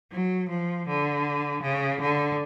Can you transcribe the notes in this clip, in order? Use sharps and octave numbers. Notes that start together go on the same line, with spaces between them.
F#3
F3
D3
C#3
D3